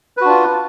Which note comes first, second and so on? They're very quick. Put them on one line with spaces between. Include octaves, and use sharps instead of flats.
B4 F#4 D4 F4